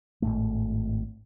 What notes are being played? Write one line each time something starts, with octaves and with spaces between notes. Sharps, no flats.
G#1 F#2 A2 A3